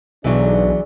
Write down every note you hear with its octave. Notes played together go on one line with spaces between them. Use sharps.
B1 E3 F#3 D4 G#4 D5